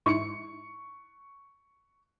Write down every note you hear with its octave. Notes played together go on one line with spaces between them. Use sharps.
G#2 E4 C#6 C#7